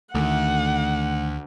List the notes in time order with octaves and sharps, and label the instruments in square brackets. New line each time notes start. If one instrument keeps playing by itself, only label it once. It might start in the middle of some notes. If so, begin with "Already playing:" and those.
[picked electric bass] D2 [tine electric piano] D#3 A3 [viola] F#5